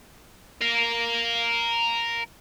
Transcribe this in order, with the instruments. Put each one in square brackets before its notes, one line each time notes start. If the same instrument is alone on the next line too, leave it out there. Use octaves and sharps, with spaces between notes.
[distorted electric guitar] A#4 F5